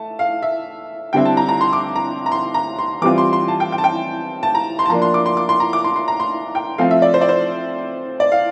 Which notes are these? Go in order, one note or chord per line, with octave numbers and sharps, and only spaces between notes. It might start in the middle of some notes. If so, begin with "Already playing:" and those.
Already playing: A3 A5
F5
E5
D3 G3 C4 E4 G5
A5
A#5
A#5
C6
D6
A#5
A#5
C6
A#5
C6
E3 G3 C4 F4 D6
C6
C6
A5
G5
G5
A5
G5
A5
A#5
C6
A5
F3 A#3 D4 A#5
C6
D6
C6
D6
C6
A#5
D6
C6
C6
A#5
C6
G5
F3 A3 C4 F5
E5
D5
C5
D5
C5
D5
F5